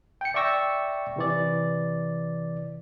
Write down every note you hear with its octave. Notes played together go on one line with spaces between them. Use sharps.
G5 C#7
D5 E5 G5 C#6 E6 A#6
C3 E3 D5